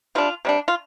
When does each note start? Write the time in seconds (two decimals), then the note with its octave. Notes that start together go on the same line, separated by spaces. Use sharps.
0.15 C3 G3 D4 F4
0.45 C3 G3 D4
0.68 F4